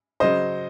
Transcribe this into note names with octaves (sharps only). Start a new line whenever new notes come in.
C#3 F#3 C5 D#5